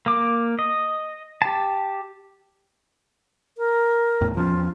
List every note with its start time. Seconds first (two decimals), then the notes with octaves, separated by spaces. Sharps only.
0.06 A#3 D6
0.59 D#5
1.42 G4 A5
3.57 A#4
4.21 E2 A2
4.35 E2 F3 C#4 F4